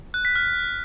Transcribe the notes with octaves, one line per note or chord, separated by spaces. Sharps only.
F#6
B6
F6